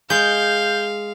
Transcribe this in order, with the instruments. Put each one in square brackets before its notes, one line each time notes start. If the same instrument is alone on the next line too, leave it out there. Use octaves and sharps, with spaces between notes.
[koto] G#3 [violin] F5 [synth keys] G6